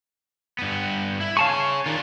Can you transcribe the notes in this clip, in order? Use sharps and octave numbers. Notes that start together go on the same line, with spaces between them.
G2 B3
E4
G#4 C#5 F5 A5 C#6
G#5 C#6
D#3 D4 F4